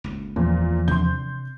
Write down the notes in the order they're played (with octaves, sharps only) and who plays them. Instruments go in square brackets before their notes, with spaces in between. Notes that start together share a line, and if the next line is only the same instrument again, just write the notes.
[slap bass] F#1 C#2 A2
[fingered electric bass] E2 [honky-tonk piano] A#2 [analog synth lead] F3
[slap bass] C3 D4 [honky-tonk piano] C6 G6